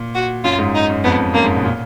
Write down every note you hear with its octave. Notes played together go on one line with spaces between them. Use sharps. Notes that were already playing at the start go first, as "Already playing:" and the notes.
Already playing: A#2
F#4
F#2 F4
G#2
D#4
F#2
F2 B3
F#2 A#3
G#2
B2
A#2